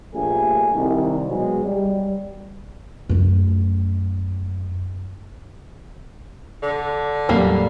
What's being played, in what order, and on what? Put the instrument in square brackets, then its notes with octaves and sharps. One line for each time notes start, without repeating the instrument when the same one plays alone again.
[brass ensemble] A#1 G2 A3 F4 G#4 G#5
C2 D#3
B2 F#3 G#3
G3
[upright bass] F#2 A3
[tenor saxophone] D3
[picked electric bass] E2 A2 F#3 [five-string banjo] G3 A#3